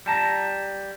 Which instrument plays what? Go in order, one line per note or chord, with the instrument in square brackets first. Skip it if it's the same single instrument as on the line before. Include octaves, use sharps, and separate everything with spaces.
[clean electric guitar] G3 A5 A#5